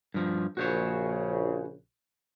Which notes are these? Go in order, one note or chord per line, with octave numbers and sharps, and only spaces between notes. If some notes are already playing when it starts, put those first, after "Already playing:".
G2 F3
A#1 C#3 F#4 C5 C#5